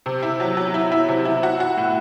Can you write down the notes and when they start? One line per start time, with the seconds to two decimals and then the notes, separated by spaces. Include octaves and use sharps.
0.06 C3
0.23 E4
0.40 F#3
0.57 F#3
0.74 E4
0.92 E4
1.08 C3
1.25 E4
1.43 F#4
1.60 F#4
1.77 A2